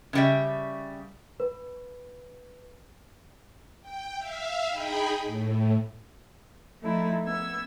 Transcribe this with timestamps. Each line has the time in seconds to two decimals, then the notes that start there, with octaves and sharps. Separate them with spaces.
0.13 C#3 G3 E5
1.40 B4
3.81 G5
4.17 E5 F5
4.69 D#4 G#4 G5 B5
5.23 A2
6.81 F3 A3 D#4 E4
7.25 B3 E6 G#6